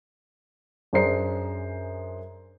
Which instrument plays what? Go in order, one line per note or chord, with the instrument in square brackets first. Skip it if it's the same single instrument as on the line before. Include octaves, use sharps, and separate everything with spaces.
[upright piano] F#2 D4 G#4 C5 A#5 C7